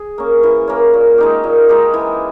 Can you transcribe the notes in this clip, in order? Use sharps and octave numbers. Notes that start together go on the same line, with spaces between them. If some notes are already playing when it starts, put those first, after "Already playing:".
Already playing: G#4
A#3 C#4
E3
A#3 C#4
A#2
G#3 D#4 G4
A#2
G#3 D#4 G4
E3